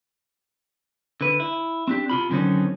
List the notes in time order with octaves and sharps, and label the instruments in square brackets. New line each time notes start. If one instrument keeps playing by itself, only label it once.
[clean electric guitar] D3 B4
E4
C4 D4 G4
C3 F4 B5
F#2 D3 D#3 F#3 C4 C#4